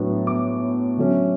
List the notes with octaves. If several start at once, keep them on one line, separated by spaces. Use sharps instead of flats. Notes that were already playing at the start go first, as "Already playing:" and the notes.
Already playing: A2 F#3 B3 D4
D6
D3 F#3 A3 C#4